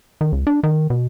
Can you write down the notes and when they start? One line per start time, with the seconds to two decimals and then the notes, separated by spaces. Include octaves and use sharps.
0.21 D#3
0.32 C#2
0.47 D4
0.63 D#3
0.90 B2